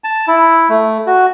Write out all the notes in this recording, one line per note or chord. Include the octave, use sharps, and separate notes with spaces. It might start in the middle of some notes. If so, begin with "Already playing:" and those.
A5
E4
A3
F#4